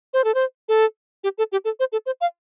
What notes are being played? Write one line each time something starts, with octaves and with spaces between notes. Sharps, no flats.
C5
A4
C5
A4
G4
A4
G4
A4
C5
A4
C5
F5